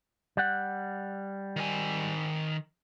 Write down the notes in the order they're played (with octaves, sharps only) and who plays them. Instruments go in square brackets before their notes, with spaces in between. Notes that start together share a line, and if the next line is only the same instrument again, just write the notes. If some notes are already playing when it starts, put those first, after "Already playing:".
[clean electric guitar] G3 F#5
[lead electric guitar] D#3 G#5